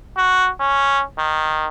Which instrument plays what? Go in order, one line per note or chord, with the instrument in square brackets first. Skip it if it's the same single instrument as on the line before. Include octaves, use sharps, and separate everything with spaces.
[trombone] F#4
C#4
D#3